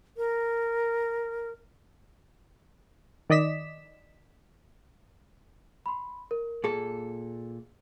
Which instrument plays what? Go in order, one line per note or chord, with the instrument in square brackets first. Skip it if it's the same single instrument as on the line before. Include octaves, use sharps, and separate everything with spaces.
[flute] A#4
[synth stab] D#3 D5 D#5 B6 E7
[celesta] B5 C6
A#4
[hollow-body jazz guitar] A#2 A4 [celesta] G#4